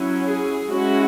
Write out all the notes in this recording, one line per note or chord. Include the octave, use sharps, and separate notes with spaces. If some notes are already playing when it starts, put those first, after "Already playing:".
Already playing: F#3 C#4 E4
G#4
G#3 C#4 E4 F#4